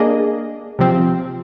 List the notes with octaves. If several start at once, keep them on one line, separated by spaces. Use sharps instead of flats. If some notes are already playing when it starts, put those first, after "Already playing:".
Already playing: A#3 D4 G#4 D#5
C3 F3 C4